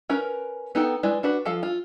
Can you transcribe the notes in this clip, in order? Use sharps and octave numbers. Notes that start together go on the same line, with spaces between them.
C#4 A#4 B4
B3 D#4 A4 G5
G#3 E4 B4 D5
D4 F#4 B4
F3 A4 F5
F4